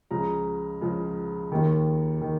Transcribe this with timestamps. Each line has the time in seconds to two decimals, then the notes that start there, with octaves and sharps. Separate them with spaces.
0.11 C#2 C#3 F3 A#5
0.81 C#2 C#3 F3
1.52 D#2 D#3
2.21 D#3